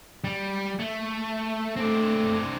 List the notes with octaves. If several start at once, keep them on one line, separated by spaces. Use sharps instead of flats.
G3
A3
A3 C4 D4